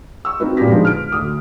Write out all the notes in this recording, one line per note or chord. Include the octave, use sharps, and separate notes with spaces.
C#6 E6
C4 D#4 F4 F#4 B4
A#2 G3 C#4 G4 A#6 B6
D3 F3 G#3 B3 D#4
F6 D7
D2 D#6